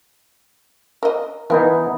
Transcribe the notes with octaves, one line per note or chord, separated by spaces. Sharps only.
A#4 D#5
E3 B3 D#4 A#4